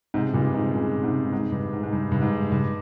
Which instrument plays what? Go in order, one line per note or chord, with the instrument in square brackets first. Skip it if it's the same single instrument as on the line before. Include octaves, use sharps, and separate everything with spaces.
[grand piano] G#2 C3
G2 A#2
G#2 C3
A#2 C#3
G#2 C3
G#2
G2
G#2
G#2
G2
G2
G#2
G2